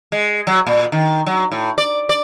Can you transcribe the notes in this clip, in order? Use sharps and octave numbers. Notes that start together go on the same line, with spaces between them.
G#3
F#3
A#2
D#3
F#3
A2
D5
D5